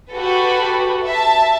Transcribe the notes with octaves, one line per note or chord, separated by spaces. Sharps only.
F#4 G4 A4 B4
E5 A5